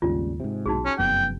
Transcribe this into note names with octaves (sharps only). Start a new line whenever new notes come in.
G#1 D#2 C#3 G3 F4
G#2 C3
B1 D#4 F#4 G#4
C#4
F1 F#2 B3 G5